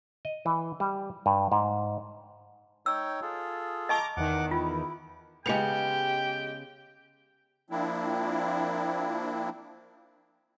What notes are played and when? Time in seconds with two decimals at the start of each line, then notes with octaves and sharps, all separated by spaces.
0.25 D#5
0.46 E3
0.80 G3
1.26 G2
1.52 G#2
2.86 D#4 C#5 G5 E6
3.22 F4 G#4 A4
3.89 D#5 A5 A#5 C#6 D6
4.17 E2 D#3 F#5 D6
4.51 E4 F4
5.46 C#3 G#3 B3 G4 G5 C#7 F7
7.70 F3 A#3 C4 D4 E4